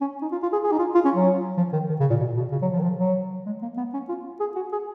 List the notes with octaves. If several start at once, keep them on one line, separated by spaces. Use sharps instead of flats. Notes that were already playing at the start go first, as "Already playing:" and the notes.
C#4
D#4
F4
F4
G#4
G#4
D#4
F4
F4
C#4
F#3
F3
D#3
D#3
C#3
A#2
B2
B2
C#3
F#3
F3
D#3
F3
F#3
G#3
A#3
B3
C#4
F4
G#4
F#4
G#4